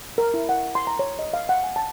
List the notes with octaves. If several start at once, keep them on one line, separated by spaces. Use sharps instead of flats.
A#4
E4
F#5
C6
A#5
C#5
D#5
F5
F#5
G#5
A5